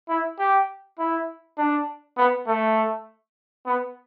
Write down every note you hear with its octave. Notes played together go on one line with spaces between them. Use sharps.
E4
G4
E4
D4
B3
A3
B3